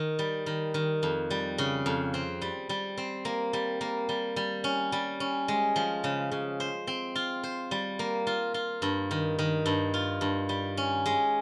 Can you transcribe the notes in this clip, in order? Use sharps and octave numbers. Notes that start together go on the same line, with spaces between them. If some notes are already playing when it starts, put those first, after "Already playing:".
Already playing: D#3
G3
D#3
D#3
F2
G3
C#3
F2
C4
G3
G3
C4
A#3
G3
A#3
G3
G3
C#4
G3
C#4
G#3
F3
C#3
C#3
C5
C4
F4
C5
G3
A#3
F4
F4
G2
D#3
D#3
G2
F4
G2
G3
C#4
G#3